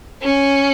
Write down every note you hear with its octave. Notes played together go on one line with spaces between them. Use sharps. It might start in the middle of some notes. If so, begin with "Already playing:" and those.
C#4